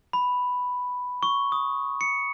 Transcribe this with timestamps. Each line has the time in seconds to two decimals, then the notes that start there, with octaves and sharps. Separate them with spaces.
0.13 B5
1.23 C#6
1.52 D#6
2.01 C#7